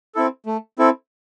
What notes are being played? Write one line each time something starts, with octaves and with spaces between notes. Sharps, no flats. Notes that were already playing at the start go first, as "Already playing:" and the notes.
C4 E4 A4
A3
C4 E4 A4